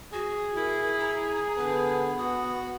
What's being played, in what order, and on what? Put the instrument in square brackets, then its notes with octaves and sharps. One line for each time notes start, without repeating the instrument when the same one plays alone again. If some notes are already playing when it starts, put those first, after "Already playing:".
[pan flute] F#4 [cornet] G#4
[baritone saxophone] E4 [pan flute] A#4
[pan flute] A#5
[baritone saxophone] D3 [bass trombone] B3 [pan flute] B4
[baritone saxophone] F#4 [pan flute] D#6